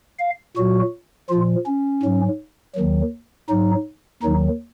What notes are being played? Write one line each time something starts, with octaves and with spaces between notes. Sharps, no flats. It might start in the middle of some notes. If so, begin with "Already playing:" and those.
F5
A#2 F#3 F#4
A#2 F3 F4
C#4
G#2 F#3
D#2 D#3 F#3
G#2 F#3 D#4
D#2 D#3 F#3 D#4